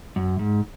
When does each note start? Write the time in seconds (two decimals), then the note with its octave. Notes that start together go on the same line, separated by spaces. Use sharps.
0.16 F#2
0.39 G#2